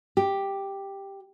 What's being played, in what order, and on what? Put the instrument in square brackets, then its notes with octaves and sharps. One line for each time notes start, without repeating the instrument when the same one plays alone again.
[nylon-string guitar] G4